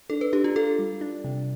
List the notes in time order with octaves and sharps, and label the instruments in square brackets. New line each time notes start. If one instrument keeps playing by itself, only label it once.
[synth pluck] D4 [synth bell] A4
[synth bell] B4
[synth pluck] D4 [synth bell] G4
[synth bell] F4
[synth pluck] F4 [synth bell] A4
[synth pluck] G3
D4
C3